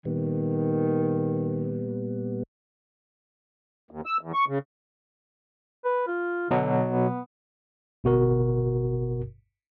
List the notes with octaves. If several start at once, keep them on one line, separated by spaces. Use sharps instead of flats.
A#2 D#3 G3 B3
D#2
E6
E2
C#6
C#3
B4
F4
B2 D3 F#3
B3
G1 B2 F#4 A#4